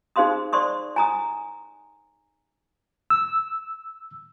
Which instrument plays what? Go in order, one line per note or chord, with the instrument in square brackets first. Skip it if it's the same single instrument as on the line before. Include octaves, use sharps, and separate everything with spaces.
[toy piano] D#4 G#4 C5 F5 C6 D#6
C5 D5 C6 C#6 D#6
G#5 A#5 D#6
[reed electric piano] E6